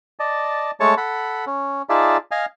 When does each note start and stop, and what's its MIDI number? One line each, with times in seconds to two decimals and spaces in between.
0.19 0.71 74
0.19 0.71 75
0.19 0.71 81
0.80 0.95 56
0.80 0.95 57
0.80 0.95 73
0.80 0.95 81
0.80 0.95 85
0.97 1.45 69
0.97 1.45 78
0.97 1.45 83
1.47 1.82 61
1.89 2.17 63
1.89 2.17 65
1.89 2.17 68
1.89 2.17 74
1.89 2.17 76
1.89 2.17 81
2.31 2.46 75
2.31 2.46 77
2.31 2.46 80
2.31 2.46 89